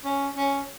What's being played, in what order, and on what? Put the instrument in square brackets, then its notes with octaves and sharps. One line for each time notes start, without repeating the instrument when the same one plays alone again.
[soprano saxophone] C#4
C#4